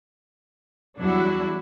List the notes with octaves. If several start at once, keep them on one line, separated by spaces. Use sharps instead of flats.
E2 F#3 G3 D4 E4 F#4